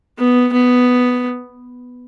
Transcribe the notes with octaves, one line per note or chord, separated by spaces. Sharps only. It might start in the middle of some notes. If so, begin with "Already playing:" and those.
B3
B3